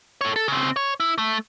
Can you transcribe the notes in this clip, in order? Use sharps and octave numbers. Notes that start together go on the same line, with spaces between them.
A4 C#5
A4
C#3 C4
C#5
E4
A3